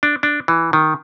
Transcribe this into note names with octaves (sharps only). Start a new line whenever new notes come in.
D4
D4
E3
D#3